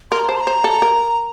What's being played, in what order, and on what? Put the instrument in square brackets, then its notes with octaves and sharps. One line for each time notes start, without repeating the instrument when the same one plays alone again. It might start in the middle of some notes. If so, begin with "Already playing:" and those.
[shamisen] A#4 [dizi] C6
[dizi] A#5
[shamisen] C5 [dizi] A5
[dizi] C6
A#5
[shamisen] C5
A4
A#4